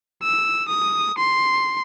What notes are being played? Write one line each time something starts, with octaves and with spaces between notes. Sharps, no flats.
E6
D#6
C6